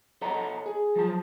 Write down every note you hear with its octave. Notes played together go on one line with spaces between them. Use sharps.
A4 C#5 D#5 F#5 A5 A#5
G#4
F3 F#3 A5